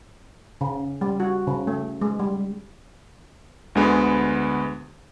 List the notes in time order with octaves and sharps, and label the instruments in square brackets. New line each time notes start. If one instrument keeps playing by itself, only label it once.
[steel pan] C#3
G3
F#4
C#3
A3
G#3
G3
[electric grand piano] D2 D3 G#3 B3